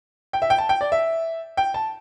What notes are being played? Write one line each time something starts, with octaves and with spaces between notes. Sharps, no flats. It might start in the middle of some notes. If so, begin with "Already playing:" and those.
G5
E5
G5
A5
G5
D5
E5
G5
A5